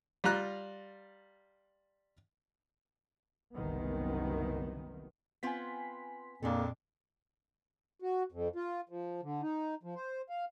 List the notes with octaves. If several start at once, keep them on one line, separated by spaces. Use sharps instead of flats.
G3 F4 A#5 F#6
F#1 C2 F#2 C3 D#3 B3
B3 C4 F4 G#5 C6 B6
F2 A#2 A#3 D4 G#4 A4
F#4
F2
F4
F3
D3
D#4
F3
C5
F5